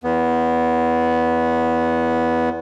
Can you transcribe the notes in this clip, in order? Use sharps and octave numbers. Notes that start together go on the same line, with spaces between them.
E2 B3